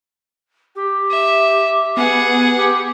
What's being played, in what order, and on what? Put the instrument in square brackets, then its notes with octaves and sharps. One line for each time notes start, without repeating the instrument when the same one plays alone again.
[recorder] G4
[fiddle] E5
[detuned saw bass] B3 [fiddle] G#4 F#5
[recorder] G4